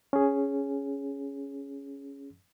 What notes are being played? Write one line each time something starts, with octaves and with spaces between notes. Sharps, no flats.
C#4 G#4